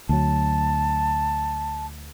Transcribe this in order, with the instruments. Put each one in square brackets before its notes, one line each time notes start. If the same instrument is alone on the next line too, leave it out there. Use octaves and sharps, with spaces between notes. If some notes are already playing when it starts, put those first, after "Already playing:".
[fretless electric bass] D2 F#3 [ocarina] A5